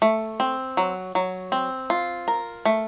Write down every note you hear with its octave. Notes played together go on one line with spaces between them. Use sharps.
A3
C4
F#3
F#3
C4
F4
A#4
A3